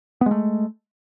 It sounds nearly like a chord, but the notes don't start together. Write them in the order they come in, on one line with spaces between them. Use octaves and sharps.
B3 G#3 A3